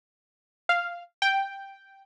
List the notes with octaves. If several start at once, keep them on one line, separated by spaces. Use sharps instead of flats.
F5
G5